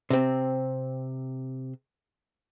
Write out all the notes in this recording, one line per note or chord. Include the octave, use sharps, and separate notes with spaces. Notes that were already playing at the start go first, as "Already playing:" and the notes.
C3 C4